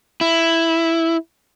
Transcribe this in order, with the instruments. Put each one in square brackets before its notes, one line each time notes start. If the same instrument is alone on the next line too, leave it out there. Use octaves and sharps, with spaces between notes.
[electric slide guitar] E4